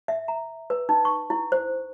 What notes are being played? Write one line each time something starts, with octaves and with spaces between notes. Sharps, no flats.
E5
A#5
B4
D#4
C#6
E4
C5